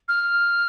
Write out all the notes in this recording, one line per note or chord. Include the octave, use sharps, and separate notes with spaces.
F6